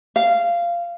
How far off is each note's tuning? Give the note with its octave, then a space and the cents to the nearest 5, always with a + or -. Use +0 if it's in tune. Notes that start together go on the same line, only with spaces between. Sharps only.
F5 -15